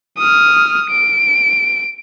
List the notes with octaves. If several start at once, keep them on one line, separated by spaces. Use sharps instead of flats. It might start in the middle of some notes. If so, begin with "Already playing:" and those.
D#6 F6
D7